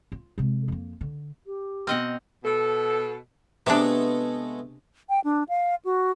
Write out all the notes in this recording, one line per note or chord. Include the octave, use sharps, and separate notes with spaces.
F4
C3 G#3
F2 A#3
D3
G4
B2 C4 D#5 F#5 F6
B2 A4
C3 G#3 A3 B3 D4
G5
D4
F5
F#4